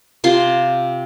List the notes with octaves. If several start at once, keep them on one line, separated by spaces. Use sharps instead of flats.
C3 F4 C6